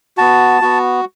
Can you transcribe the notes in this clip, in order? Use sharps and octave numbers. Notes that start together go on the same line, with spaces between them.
B3 F#4 A5
B3 F#4